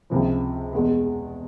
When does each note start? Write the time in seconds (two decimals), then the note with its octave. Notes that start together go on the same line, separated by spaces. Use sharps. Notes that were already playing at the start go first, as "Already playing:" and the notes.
0.10 C#2 C3 F3
0.73 E2 B2 G#3